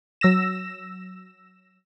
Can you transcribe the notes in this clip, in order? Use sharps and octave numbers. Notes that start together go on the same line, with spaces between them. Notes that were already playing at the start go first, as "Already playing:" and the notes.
F#3 E6 A#6 E7